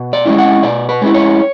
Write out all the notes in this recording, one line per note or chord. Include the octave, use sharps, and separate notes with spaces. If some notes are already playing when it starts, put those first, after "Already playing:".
Already playing: B2
D5
G#3 C#4 E4
F#5
B2 D5
B4
G#3 C#4 E4
C#5